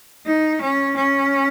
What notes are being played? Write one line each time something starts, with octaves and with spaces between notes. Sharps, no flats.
D#4
C#4
C#4